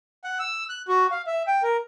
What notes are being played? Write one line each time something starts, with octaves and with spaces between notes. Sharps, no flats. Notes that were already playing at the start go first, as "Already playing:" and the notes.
F#5
E6
F#6
F#4
F5
E5
G5
A#4